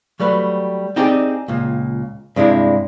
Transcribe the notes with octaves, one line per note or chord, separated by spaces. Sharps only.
F#3 G3 A3 B4
C4 D#4 G4 G#4 D5
C#2 A#2
G2 C3 G#3 D4 E4